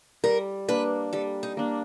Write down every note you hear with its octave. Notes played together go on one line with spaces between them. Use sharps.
G3 A#4
A#3 D4 B4
G3 A4
D#4
A#3 D4